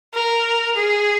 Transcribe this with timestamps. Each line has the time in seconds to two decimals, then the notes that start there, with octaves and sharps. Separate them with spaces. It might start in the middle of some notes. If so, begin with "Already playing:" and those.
0.14 A#4
0.75 G#4